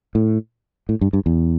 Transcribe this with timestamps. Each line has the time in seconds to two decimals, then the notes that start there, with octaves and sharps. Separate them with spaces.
0.15 A2
0.89 A2
1.01 G2
1.13 G2
1.26 E2